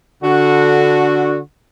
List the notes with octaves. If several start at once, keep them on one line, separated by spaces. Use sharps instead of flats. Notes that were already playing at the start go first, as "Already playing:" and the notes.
D3 F#4